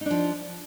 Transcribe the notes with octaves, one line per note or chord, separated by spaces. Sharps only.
F3 D4 D#4